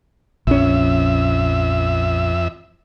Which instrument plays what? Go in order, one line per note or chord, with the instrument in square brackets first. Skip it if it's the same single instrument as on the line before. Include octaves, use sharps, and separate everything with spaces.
[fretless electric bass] A#1 C#4 [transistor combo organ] F2 E5